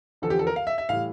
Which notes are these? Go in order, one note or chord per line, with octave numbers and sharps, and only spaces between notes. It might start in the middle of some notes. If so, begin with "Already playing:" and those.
E2 D3 F3 A4
G4
A4
A#4
F5
E5
E5
A2 E3 G3 F5